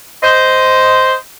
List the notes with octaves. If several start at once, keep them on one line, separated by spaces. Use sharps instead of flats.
C5 D#5